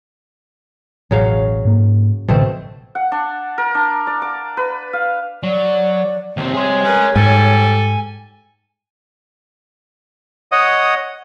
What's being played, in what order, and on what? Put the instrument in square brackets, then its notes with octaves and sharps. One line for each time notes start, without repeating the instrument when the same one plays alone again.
[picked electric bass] E1 A1 [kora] C#3 F#3 F5
[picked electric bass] G#2 A#3
[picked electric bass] A1 D3 F3 [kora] B2 A3 C4
[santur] F#5
D4
A#4
D4
D5
D6
B4
F5
[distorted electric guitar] F#3 [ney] D5
[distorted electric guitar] D#2 C4 [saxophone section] C3
[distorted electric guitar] G#4 C6 [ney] C#5
[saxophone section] C#4 A#4 B4
[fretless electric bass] G#2 [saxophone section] G3 A4 [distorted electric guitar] G#5
[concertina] C#5 D#5 F#5 D#6